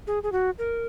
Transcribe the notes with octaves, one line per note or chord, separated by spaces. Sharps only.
G#4
G#4
F#4
A#4